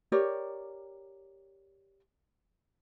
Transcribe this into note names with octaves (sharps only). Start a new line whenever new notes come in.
G4 A#4 C#5 D5